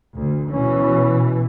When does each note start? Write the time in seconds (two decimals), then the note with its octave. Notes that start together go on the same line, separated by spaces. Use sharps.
0.16 D2
0.50 B2 E3 C#4